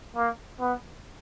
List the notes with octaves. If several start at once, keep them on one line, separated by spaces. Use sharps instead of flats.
A#3
B3